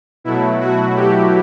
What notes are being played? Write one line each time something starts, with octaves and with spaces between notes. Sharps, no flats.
B2 F#3 A3 E4
F#4
G4